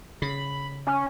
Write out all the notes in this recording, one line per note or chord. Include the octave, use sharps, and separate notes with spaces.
C#3 B5
C#4 G#5